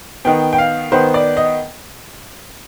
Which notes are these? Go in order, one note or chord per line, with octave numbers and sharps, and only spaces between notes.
D#3 B3 G5
G5
F5
D#3 B3 C5
D5
D#5